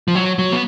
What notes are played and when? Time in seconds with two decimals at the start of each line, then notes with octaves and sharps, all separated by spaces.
0.08 F3
0.15 F#3
0.39 F#3
0.52 B3